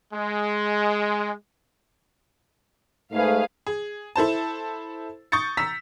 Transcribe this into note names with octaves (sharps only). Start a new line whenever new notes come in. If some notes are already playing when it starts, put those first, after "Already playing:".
G#3
G#2 A3 G#4 B4 F5
G#4
E4 A4 C5 A5
C#6 D#6 G6 A6 C#7
A#5 E6 B6